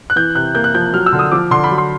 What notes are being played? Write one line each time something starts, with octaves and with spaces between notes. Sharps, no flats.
F#6
E3 G6
C3 F#6
A#3 G6
F#6
F3 G6
F#3 F6
E6
D3
D#6
F3 D6
D3 C6
B5
F#3
C6